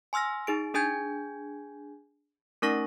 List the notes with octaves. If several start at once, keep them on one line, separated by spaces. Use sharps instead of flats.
G#5 C6 E6 F6 A#6
D#4 G#4 D7
D4 G#4 G#5 G6 G#6
A3 C#4 D#4 A#4 C#6 A#6